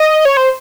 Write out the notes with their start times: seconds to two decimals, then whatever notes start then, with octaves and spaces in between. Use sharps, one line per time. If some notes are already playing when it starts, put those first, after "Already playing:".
Already playing: D#5
0.25 C#5
0.37 C5